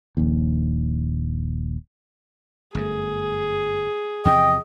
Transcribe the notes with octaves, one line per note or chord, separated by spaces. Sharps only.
D#1 A#1 D#2
G1 F#2 A3 G#4
E2 C3 F3 D#5 G5